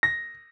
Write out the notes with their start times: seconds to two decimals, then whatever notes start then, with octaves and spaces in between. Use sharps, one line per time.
0.03 A#6